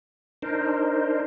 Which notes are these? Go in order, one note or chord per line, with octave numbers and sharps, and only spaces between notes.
D4 D#4 A#4 C5